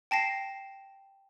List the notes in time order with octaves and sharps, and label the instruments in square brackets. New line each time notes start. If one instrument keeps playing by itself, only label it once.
[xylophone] G5 A5 A#6 C7